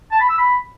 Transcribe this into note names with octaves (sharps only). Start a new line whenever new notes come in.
A5
B5
E6
B5